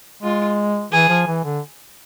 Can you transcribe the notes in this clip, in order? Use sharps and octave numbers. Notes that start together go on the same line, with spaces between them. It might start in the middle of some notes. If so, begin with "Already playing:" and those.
G#3 F4
E3 G#4
F3
E3
D3